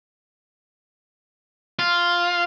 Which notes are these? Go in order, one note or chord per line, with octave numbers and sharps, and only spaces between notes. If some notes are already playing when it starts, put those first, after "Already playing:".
F4